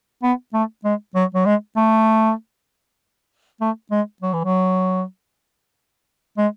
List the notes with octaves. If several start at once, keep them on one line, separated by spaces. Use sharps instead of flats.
B3
A3
G#3
F#3
F#3
G#3
A3
A3
G#3
F#3
E3
F#3
G#3